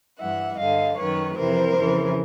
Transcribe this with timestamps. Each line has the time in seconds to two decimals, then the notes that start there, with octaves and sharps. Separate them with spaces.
0.19 G2 E3 E5 F#5
0.58 G2 D3 D#5 F5
0.97 F#2 D#3 B4 C#5
1.37 F2 C3 E3 A#4 C5
1.77 F2 C#3 E3